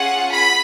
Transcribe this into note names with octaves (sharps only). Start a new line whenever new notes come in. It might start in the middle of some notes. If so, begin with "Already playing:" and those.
Already playing: C#4 F4 G#4 F#5
B5